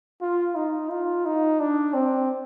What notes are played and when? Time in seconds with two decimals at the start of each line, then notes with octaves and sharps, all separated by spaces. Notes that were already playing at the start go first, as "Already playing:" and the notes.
0.21 F4
0.55 D#4
0.90 F4
1.26 D#4
1.60 D4
1.94 C4